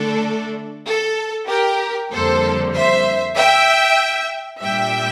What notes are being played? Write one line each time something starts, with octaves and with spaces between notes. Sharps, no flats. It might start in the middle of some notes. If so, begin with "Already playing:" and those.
Already playing: D3 A3 D4 A4
A4
G4 A#4
F2 D3 G3 A#3 A4 C5
C5 E5
E5 G5
A#2 G3 D4 E5 G5